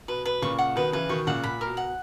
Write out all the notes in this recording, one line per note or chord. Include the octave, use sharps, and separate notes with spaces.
B2 B4
B4
A#2 C#3 C#6
F#5
B2 D#3 B4
C#3 E3 B4
B2 D#3 C#6
A#2 C#3 F#5
A#2 B5
A#4
B2
F#5